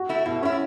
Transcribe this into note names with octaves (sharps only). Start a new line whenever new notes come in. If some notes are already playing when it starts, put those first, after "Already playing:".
Already playing: F#4
A3 E4
B2 E4
A3 C#4 E4